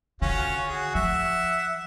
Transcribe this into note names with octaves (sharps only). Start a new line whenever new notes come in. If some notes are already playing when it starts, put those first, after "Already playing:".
D3 C#4 F4 F#4
F#4 G#4
F3 E5 F#5